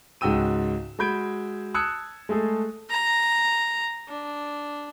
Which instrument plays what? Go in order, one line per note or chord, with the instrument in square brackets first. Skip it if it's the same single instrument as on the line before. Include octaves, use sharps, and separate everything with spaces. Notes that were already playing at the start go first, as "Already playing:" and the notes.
[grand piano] C#2 G#2 F#4 G5 E6 D#7
G#3 F#4 B5 G6 G#6 D7
A5 D#6 E6 F#6 G#6 C#7
G#3 A3 G#4 A4
[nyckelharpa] A#5
D4